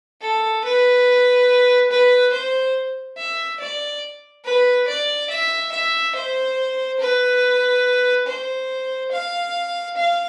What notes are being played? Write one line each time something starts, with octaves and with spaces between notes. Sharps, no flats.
A4
B4
B4
C5
E5
D5
B4
D5
E5
E5
C5
B4
C5
F5
F5